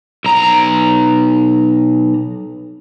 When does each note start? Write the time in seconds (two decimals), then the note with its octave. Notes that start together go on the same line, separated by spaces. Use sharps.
0.24 B1 A#5